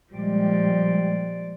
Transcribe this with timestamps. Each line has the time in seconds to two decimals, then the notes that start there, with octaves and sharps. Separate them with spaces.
0.13 A#2 F3 G3 G#3 D5